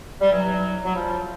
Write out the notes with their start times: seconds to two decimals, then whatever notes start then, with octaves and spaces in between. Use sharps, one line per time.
0.21 G3
0.31 E3 F#3
0.84 F#3
0.95 F3 G3